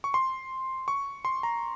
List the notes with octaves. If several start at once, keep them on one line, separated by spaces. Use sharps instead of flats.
C#6
C6
C#6
C6
A#5